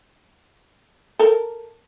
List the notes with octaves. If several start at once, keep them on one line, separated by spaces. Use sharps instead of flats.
A4 A#4